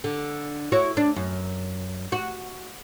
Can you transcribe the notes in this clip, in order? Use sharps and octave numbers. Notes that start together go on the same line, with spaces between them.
D3
E4 F#4 C#5
D4
F#2
F#4